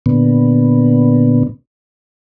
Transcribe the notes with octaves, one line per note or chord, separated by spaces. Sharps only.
A#2 D3 B3